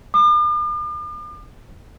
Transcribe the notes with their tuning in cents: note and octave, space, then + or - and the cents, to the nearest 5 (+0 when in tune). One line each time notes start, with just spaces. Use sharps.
D6 +45